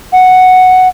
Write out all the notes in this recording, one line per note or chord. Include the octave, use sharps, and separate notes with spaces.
F#5